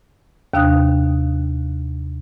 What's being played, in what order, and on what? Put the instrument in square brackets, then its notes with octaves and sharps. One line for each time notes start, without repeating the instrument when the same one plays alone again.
[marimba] D#2 C3 D4 F5 D#6 F#6